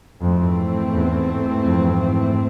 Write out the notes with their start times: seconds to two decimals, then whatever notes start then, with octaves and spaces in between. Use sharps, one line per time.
0.21 F2 G#2 E3 A3 C4
0.93 E2
1.66 F2